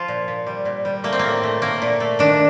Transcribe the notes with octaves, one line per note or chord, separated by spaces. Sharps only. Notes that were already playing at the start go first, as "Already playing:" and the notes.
Already playing: F3 F4
A#2
A#2
G3
A#2
G3
A3 A#3
C4
A2 A#3
A3
A3 A#3
A#2
A3
D#3 D4